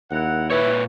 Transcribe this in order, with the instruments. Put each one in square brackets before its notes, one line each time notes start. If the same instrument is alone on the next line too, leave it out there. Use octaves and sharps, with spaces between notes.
[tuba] D#2 [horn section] E4 A#4 F#5
[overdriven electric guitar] A#2 C#5 [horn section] E4 [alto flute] B4